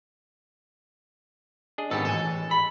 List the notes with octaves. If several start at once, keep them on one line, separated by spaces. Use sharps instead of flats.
D4 G#4 D#5
G#1 G#2 B2 G4 A4
A1 G#3 A4 G#5
B5